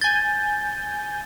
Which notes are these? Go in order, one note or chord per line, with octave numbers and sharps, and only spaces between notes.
G#5 G6 A6